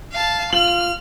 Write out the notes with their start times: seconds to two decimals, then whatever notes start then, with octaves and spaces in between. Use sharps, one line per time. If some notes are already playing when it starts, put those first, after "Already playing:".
0.12 F5 A5
0.53 F4 F6 F#7